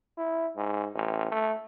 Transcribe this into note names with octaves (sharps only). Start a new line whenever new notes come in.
E4
G#2
A1
A3